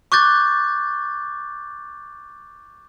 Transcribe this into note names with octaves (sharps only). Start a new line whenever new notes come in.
C#6 D6 F#6 G6 A6